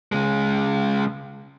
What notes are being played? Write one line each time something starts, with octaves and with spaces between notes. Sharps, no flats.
C#3 G#3